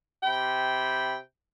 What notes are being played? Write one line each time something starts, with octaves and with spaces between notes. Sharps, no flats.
C3 G5 B5